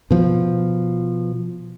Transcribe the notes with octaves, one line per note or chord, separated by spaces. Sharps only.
B2 F3